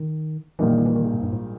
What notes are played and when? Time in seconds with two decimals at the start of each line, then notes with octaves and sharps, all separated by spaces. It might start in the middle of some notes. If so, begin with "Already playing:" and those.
Already playing: D#3
0.59 A#1 A#2 E3 G3 A#3 D#4
0.68 D#3
0.78 D#3
0.86 E3
0.96 D#3
1.05 C#3
1.14 G#2
1.23 G2
1.33 G#2